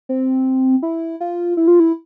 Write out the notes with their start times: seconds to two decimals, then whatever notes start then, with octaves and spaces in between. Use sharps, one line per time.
0.09 C4
0.83 E4
1.20 F4
1.57 E4
1.68 F4
1.80 E4